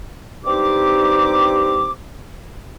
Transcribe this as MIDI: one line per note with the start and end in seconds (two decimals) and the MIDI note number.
0.45 1.89 43
0.45 1.89 60
0.45 1.89 63
0.45 1.89 67
0.45 1.89 86